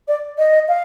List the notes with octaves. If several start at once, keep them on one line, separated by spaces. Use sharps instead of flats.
D5
D#5
F5